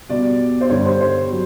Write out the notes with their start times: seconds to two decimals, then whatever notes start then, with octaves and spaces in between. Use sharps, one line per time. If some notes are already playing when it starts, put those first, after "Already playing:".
0.09 B2 G3 D5
0.61 C5
0.69 G2 D3 G3 C#5
0.85 C5
1.00 C5
1.31 F#3